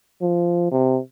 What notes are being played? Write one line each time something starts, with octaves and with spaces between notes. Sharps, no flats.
F3
C3